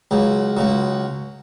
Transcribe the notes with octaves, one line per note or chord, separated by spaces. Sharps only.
C#2 C#3 F#3
C#2 C#3 F#3